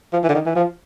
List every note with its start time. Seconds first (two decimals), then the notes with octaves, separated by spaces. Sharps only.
0.13 F3
0.23 E3
0.29 D3
0.35 D#3
0.46 E3
0.56 F3